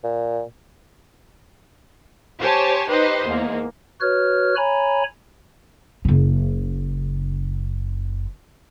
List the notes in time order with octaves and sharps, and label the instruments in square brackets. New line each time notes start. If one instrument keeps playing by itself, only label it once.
[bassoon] A#2
[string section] G4 C5 C#5 G#5 A5
D#4 G4 B4 C5 D#5
E2 G#2 A#3
[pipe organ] F#4 B4 C#5 F6
C#5 G#5 A#5 B5
[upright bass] F#1 C#3